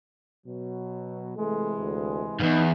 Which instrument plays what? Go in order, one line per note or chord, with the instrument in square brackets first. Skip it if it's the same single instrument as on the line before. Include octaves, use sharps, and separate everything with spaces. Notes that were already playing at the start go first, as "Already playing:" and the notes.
[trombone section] B2 F#3
[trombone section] C3 E3 G#3 [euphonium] A3
[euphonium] D2
[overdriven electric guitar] E2 G2 [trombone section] B3 [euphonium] D#4